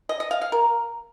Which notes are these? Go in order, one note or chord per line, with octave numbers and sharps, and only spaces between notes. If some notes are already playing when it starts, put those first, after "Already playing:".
D#5
D#5
F5
F5
A#4